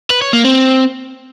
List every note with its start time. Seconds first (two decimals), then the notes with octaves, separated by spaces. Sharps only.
0.10 B4
0.22 C#5
0.33 A#3
0.45 C4